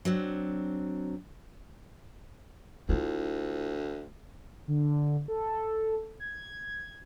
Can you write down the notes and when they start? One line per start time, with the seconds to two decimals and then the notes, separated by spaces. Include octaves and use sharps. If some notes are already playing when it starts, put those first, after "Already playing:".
0.05 F#3 C4 D4
2.89 D2 E4 F4
4.68 D3
5.28 A4
6.20 G#6